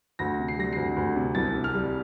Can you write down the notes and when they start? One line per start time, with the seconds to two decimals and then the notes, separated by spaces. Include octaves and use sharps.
0.19 D2 A#6
0.39 C3
0.48 C7
0.58 G3 A#6
0.73 D2 C7
0.96 D2
1.16 C3
1.35 C2 A6
1.55 C3
1.64 F6
1.74 G3